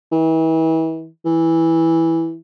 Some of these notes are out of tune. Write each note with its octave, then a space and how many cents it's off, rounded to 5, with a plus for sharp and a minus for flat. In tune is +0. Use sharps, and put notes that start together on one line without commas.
E3 -35
E3 -5